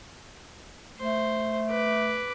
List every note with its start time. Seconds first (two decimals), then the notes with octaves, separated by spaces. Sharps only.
0.99 A3 C5
1.70 B4 D6